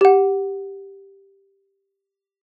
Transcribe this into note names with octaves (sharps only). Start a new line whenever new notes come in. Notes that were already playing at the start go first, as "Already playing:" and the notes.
G4 F#5